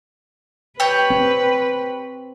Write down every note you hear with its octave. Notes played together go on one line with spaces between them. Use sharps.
G4 B4 C#5
C4